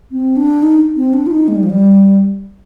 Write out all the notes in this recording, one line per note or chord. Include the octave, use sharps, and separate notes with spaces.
C4
D4
D#4
C4
D4
F4
D#4
G#3
G3
F3
G3